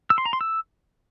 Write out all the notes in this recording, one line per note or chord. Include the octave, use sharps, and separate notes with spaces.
E6
C6
A#5
C6
E6